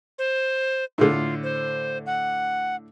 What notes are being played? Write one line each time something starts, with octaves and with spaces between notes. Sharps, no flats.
C5
A2 D3 F4
C5
F#5